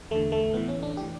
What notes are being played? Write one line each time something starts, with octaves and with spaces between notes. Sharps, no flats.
E2 D3 A3
A3
A2 E3 B3
C#4
D4
E3 G4